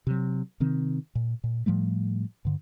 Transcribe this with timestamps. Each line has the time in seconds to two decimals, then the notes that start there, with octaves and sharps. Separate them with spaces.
0.07 C3 F#3
0.60 C3 D#3 C4
1.15 A#2
1.44 A#2
1.66 A2 F3 G3 A3
2.45 G2 D3